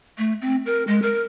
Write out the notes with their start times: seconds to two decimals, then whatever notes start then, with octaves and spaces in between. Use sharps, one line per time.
0.18 A3
0.42 C4
0.66 A#4
0.87 G#3
1.02 A#4